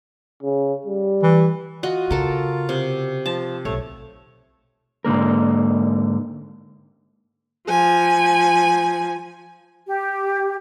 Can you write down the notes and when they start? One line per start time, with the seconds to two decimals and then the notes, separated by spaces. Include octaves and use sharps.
0.43 C#3
0.86 G3
1.23 E3
1.83 F4 F#4 D#5
2.11 C#3 A4 A#4
2.69 C3
3.26 F3 A5
3.65 B1 A3 C#5
5.05 G#2 D3 A#3 A#4
7.68 F3 G#5
9.86 G4